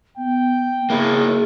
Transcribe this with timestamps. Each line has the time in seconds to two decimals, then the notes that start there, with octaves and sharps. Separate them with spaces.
0.18 B3 G5
0.90 A#3 E4 G#4